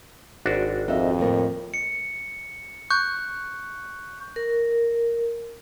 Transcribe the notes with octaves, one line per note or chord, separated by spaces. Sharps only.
G#1 D4 F#4
F2 D#4 E5 F5
D#2 A2 A#4
C#7
C#6 F#6 G6
A#4